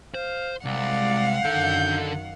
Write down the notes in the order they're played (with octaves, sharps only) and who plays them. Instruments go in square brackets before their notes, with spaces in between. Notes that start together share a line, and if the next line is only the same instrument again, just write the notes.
[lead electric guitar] C5 [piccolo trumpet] F5
[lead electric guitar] C2 [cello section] G#3 [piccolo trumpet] D5 [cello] F5 F#5
[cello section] F#2 D#3 [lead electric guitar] D3 A4 [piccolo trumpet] G6